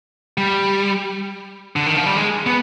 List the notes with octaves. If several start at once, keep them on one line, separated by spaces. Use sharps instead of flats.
G3
D3
D#3
F3
G3
G#3
B3